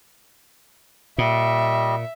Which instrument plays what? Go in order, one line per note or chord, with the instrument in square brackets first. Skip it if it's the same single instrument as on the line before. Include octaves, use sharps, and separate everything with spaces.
[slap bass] A#2 [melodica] G3 D#5 [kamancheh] E5